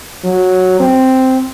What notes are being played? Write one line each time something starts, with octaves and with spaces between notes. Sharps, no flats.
F#3
C4